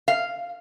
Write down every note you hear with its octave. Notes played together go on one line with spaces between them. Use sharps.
F5